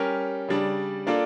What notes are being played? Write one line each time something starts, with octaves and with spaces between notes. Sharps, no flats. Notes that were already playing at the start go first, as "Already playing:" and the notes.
Already playing: G3 C#4 G4 A#4
C#3 G3 D4
A#3 D4 F4 A4 D5